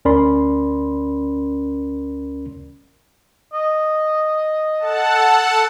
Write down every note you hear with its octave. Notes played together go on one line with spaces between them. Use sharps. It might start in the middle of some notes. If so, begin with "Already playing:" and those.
D2 C#4 A#4 D5 B5 C6
D#5
A4 F#5 A5